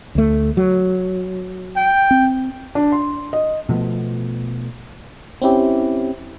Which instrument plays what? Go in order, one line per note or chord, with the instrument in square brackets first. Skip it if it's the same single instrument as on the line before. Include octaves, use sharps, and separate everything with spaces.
[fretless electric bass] D2 A3
F#3
[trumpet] G5
[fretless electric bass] C4
[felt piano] D4
C6
D#5
[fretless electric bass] B2 F3 A3 B3
[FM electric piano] C4 C#4 E4 G4